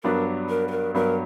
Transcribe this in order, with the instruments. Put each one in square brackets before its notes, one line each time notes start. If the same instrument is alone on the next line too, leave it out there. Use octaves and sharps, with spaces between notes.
[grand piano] G2 F#3 B3 D4 [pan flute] A#4
[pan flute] A#4
B4
A#4
[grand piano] G2 F#3 B3 [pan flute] A#4